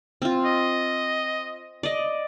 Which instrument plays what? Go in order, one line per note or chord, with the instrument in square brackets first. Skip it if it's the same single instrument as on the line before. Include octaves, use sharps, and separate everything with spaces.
[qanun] C4 F4
[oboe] D#5
[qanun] D5 D#5